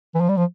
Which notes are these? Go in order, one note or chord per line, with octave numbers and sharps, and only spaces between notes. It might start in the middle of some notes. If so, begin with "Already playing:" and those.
E3
F3
G3
F3